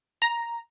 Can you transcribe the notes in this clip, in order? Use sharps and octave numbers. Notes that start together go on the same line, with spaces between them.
A#5